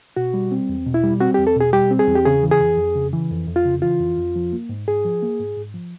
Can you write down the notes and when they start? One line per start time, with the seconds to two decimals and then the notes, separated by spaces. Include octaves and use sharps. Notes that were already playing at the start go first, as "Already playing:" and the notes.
0.16 B2 F#4
0.34 G3
0.51 C4
0.69 E2
0.86 B2
0.94 E4
1.03 G3
1.20 C4 F#4
1.34 E2 G4
1.47 A4
1.56 B2 G#4
1.73 G3 G4
1.91 C4
1.99 G#4
2.08 E2
2.15 G4
2.26 C#3 G#4
2.43 E3
2.51 G#4
2.60 F2
2.77 F2
2.96 C#3
3.13 E3
3.30 F2
3.47 F2
3.56 F4
3.65 C#3
3.82 E3 F4
4.00 F2
4.17 F2
4.36 F3
4.53 A#3
4.69 G#2
4.88 G#2 G#4
5.05 F3
5.22 A#3
5.40 G#2
5.57 G#2
5.74 F3